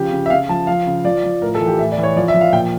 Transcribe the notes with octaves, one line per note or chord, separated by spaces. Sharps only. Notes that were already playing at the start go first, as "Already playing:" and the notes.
Already playing: C#3 F3 G4
C#3
E5
C#3 F5
F3 A5
F3 F5
C#3
F3 D5
F3
A2 A#4
A4
E3
G4
A2 E5
D5
E3
C#5
F3 D5
E5
F3
F5
A#2 G5